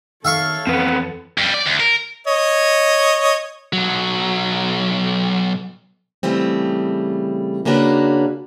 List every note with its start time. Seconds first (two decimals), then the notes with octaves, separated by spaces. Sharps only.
0.25 D#3 A4 C#5 E5 F5 C#6
0.67 F2 E3 C4 B4 F#5
1.38 F2 G3
1.54 D5
1.67 D2
1.80 A#4
2.27 C#5 D#5
3.73 B1 F#3
6.23 C#3 E3 G3 A3 C4
7.65 C#3 A#3 C#4 D4 F#4 B4